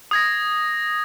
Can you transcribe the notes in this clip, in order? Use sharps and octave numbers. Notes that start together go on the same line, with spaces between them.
D#6 G#6 A#6